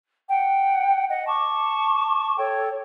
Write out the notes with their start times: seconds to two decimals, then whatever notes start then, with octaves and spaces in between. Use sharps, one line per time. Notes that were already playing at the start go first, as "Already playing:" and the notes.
0.30 F#5 G5
1.09 D#5 F#5
1.27 A5 C#6 D6
2.38 A4 C#5 G5